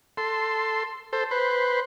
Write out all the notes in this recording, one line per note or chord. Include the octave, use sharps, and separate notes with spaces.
A4 C6
A4 C5
B4 C5